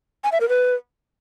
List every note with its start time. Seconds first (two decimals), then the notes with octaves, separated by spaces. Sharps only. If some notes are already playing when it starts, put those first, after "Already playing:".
0.24 G#5
0.32 E5
0.41 A#4
0.49 B4